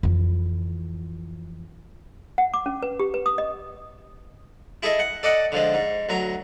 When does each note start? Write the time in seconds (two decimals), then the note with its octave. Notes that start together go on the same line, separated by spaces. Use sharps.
0.03 F2 E3
2.38 F#5
2.54 D6
2.66 C#4
2.83 B4
3.00 G4
3.14 B4
3.26 D#6
3.38 D#5
4.83 E4 G#4 A4 D#5
4.99 F#5
5.23 A4 D5 D#5 F#5
5.52 D3 F3 G#3
5.74 G#2
6.09 D2 F#3 A#5